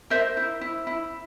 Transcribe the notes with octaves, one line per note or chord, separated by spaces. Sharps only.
A#4 C5 E5
E4
E4
E4